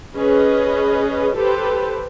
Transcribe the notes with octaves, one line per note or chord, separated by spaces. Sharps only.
C#4 G#4 B4 D#5
G4 A4 B4 C5